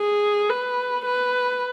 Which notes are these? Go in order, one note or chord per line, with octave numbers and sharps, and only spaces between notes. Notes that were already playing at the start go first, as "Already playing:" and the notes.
Already playing: G#4
B4
B4